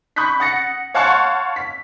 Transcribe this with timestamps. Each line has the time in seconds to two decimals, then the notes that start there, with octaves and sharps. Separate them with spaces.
0.16 B5 C#6 D#6 F#6 G6 B6
0.40 F#5 D#6 A6 A#6 C#7
0.95 C#5 F5 F#5 A5 C6 C#6
1.56 B6